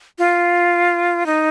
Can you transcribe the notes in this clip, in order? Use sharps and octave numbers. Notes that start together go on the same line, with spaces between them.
F4
D#4